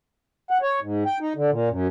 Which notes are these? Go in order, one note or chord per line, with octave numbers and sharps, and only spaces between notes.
F#5
C#5
G#2
G5
D#4
D3
A#2
F#2